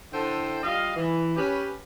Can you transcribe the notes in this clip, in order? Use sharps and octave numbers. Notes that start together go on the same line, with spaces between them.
D3 E4 A4 C5 E5 G5
G3 F4 D#5 F5
E3
C#4 G4 B4